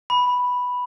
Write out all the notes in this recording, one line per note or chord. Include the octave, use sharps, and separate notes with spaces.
B5